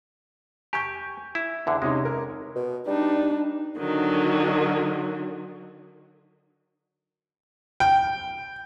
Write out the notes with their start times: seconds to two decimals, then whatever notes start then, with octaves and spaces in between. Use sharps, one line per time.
0.73 G4 G#5 C#6 G6
1.35 E4
1.67 E2 D3
1.82 C3 G#3 C#4 D#4
2.05 A#4
2.55 B2
2.87 G3 D4 D#4
3.78 D3 D#3 F#3
7.80 G5